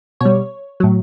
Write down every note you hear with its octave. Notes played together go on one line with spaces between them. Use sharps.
B2 G3 C#5
A2 F#3